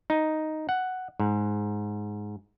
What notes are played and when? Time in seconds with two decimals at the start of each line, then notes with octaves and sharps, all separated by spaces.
0.10 D#4
0.69 F#5
1.20 G#2